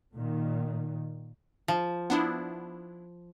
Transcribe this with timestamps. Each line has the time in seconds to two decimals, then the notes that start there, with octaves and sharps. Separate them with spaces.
0.13 A#2 D#3
1.68 F3
2.10 B3 D4 E4